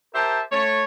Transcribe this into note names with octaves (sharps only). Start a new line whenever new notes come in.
G4 A#4 C5 E5 A5
A3 C#5